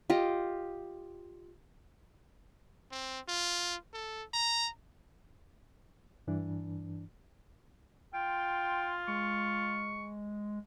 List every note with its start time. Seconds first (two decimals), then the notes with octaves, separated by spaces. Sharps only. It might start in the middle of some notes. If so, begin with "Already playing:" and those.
0.10 F4 G4 D#5
2.91 C4
3.28 F4
3.93 A4
4.34 A#5
6.27 G2 E3 D4
8.14 F4 G5 C6
9.08 G#3 C#6